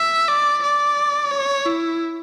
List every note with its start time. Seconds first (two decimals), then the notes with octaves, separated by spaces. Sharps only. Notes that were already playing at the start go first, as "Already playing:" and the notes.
Already playing: E5
0.28 D5
0.62 D5
1.31 C#5
1.66 E4